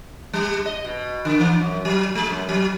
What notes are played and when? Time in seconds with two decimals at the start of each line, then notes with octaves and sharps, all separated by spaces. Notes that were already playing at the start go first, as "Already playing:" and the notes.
0.33 G3
0.66 D#5
0.84 B2
1.25 D3
1.39 E3
1.60 F#2
1.85 F#3
2.15 G#3
2.30 F#2
2.49 F#3